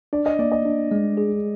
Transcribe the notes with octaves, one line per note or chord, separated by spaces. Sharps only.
D4 D5
D#5
A#3 D5
D#5
D4
G#3
G#4